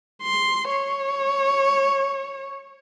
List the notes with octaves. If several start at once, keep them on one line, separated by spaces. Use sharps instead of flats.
C6
C#5